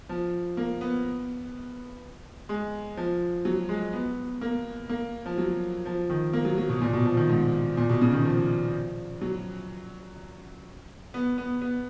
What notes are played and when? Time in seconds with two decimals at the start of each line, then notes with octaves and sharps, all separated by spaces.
0.09 F3
0.57 A#3
0.81 B3
2.49 G#3
2.97 F3
3.45 F#3
3.69 G#3
3.93 B3
4.41 A#3
4.89 A#3
5.26 F3
5.38 F#3
5.86 F3
6.10 D#3
6.33 A#3
6.45 F#3
6.58 F#3
6.69 B2
6.82 A#2
6.93 B2
7.05 F3
7.17 D#3
7.29 G#2
7.77 A#2
7.90 B2
8.01 C#3
8.13 D#3
8.26 F3
9.22 F#3
11.14 B3
11.38 B3
11.61 B3